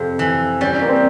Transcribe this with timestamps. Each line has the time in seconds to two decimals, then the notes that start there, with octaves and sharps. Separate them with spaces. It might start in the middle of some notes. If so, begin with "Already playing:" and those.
Already playing: F2 C3
0.19 E3
0.61 G3 C#4
0.81 A#3
0.88 C4